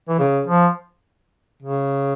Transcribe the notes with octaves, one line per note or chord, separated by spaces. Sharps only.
E3
C#3
F3
C#3